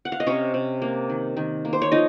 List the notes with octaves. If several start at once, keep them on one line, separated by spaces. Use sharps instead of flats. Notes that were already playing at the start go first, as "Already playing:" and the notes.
F#5
F5
D#5
C3 C#4 C#5
C3
A#3
D#3
D#3
A#3
C5
C#5
F3 D#4 D#5